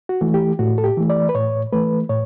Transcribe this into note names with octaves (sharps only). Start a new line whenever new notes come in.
F#4
E3 A3
G4
A2 F#4
A4
G4
E3 A3
D5
B4
A2 C#5
E3 A3 B4
A2 C#5